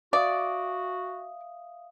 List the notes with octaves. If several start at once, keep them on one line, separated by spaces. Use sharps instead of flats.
F#4 D5 E5 F5 D#6